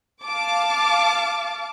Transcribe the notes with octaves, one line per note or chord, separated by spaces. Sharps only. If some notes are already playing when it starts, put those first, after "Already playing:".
F5 A5 D6